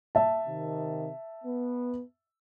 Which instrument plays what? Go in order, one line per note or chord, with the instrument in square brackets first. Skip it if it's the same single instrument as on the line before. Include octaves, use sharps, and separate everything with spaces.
[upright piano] E5 A5
[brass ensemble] C3 D#3
B3